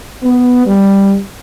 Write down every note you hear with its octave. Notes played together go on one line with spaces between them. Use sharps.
B3
G3